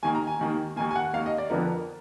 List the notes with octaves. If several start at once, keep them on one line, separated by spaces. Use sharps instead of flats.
D#2 D#3 A#3 G#5
A#5
G#5
D#2 D#3 A#3
D#2 D#3 A#3 G#5
G#5
F#5
D#2 D#3 A#3 F5
D#5
D5
F2 D3 F3 B3 A#4